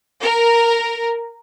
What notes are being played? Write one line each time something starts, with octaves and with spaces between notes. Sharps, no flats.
A#4